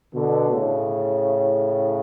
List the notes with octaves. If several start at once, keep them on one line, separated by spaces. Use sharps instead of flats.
B2 D3
A2 C#3